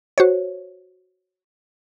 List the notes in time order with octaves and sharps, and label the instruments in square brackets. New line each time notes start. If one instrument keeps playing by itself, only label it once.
[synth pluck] F#4 C5 C#5